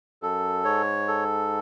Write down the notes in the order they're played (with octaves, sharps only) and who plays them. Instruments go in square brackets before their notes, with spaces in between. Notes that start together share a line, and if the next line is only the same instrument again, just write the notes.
[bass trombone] F#2 [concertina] A4
[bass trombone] G#2 [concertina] C#5
[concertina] A4